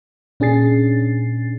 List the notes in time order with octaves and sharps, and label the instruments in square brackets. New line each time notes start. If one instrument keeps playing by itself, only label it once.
[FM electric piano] A#2 C#4 D4 G#4 A6 C7